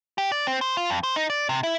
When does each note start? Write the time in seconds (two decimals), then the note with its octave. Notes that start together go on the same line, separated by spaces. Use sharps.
0.18 G4
0.32 D5
0.47 C4
0.61 C5
0.77 F4
0.90 F2
1.03 C5
1.16 D#4
1.30 D5
1.49 C3
1.63 E4